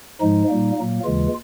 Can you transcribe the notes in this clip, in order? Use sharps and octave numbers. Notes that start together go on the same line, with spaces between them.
G#2 F3 G#3 D#4
A#2 G3 A#3
A#2 F#3 A#3
D#2 C#3 E3 G#3 F4